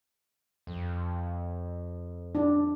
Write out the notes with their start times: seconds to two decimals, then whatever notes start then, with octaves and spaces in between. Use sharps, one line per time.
0.67 F2
2.35 D4